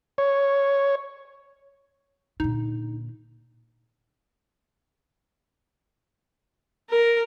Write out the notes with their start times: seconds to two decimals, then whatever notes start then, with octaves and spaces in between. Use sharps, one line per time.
0.18 C#5
2.40 A#2 D3 D#4
6.90 A#4